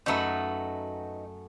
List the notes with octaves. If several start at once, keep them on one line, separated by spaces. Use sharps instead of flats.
F#2 A3 D#4 F#4 B4